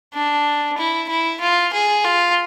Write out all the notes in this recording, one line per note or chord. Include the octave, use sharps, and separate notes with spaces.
D4
E4
E4
F4
G#4
F4